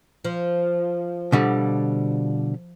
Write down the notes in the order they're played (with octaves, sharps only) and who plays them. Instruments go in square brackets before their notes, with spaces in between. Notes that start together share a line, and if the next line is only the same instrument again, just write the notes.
[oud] F3
[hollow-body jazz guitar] B2 D3 G3